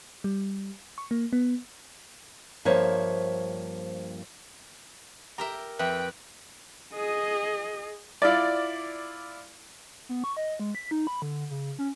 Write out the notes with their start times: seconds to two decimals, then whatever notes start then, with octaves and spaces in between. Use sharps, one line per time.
0.24 G3
0.98 C#6
1.11 A#3
1.33 B3
2.65 G2 F3 A#3 C5 C#5 E5
5.38 G4 A#4 E5 A#5
5.79 F2 B4 E5 G5
6.93 G#4 D#5
8.22 E4 F4 D5
10.09 B3
10.24 C#6
10.37 D#5
10.59 G#3
10.75 B6
10.91 D#4
11.07 B5
11.22 D3
11.50 C#3
11.79 C#4